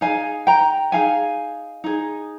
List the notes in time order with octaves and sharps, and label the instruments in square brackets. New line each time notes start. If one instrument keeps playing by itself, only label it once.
[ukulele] D#4 G#4 F5 G#5
G5 A#5
D#4 G#4 F5 G#5
D#4 G#4